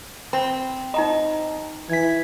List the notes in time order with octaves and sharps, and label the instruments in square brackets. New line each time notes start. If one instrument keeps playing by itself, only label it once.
[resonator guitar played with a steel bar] C4 [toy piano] B5
[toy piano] D#4 A#5 B5 [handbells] D#5
[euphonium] E3 [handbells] G#6 B6